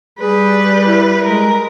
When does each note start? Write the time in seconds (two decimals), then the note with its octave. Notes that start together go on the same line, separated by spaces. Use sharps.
0.20 G3 G#4 B4
0.85 E4
1.24 G#3 A#4